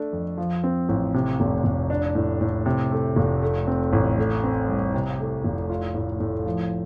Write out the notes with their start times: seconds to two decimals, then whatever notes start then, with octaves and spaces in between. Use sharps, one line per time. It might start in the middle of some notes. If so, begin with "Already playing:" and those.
Already playing: A3 D4
0.13 F2
0.37 F3
0.64 C4
0.89 A1
1.14 C3
1.40 F1
1.64 F1
1.90 D4
2.15 A2
2.41 A2
2.66 C3
2.91 A3
3.16 F1
3.42 A3
3.67 C4
3.93 A1
4.18 A3
4.44 C4
4.69 C2
4.94 C3
5.20 A3
5.45 F1
5.70 F4
5.94 A2
6.20 A2
6.46 F3